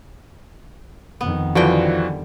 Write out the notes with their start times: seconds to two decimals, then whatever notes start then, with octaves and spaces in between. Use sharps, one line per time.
1.21 F2 D#3 B3
1.55 D3 E3 F3 G3 F#4 G5